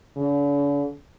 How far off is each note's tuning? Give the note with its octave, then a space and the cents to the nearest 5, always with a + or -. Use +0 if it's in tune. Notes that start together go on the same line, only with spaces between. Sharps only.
D3 -45